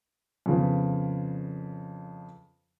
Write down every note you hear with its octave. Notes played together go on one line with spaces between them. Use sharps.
F2 C#3 B3